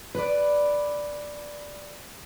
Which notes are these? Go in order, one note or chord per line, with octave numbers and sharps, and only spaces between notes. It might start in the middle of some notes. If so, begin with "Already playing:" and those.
B4 D5